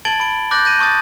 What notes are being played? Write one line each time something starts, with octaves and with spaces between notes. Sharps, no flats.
A5 G#6 A6 D7 F#7 G7
B5 D7
D6 F#6 G6 A6 A#6 F#7
G6 A#6 D#7
A5 C#6 D#6 A6